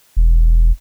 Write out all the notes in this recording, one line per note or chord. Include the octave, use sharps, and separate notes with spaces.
E1